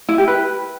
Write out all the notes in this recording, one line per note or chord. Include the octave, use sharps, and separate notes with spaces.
E4
G4
B4